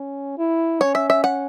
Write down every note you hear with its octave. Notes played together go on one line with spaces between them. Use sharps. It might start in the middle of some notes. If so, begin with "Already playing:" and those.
Already playing: C#4
E4
C#4 C#5
E5
E5
F#5